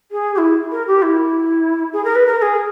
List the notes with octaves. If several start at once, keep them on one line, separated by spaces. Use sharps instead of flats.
G#4
G4
E4
A#4
G4
E4
G#4
A#4
B4
A#4
A#4
G#4